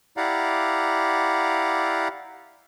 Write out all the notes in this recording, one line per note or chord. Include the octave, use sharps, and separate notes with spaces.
E4 G4 D5 F5 F#5 A#5